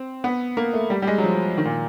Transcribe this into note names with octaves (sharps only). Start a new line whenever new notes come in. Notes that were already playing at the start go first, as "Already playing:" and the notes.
Already playing: C4
B3
A#3
A3
G3
G3
G#3
F#3
F3
D#3
A#2